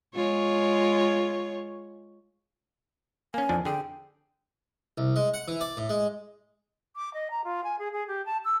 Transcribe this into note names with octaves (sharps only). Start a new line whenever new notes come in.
G#3 F4 C#5
A#3 C#4 G#5
F2 F3 D4
D3 G#4 G5
C2
G#3
F#5
E3
D5
A2
G#3
D6
D#5
A#5
F4
G#5
G#4
G#4
G4
A5
E6